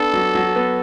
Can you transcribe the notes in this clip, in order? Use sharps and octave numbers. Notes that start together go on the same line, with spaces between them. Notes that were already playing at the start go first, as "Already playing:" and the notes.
Already playing: B3 D4 A4
F#3
F#3
B3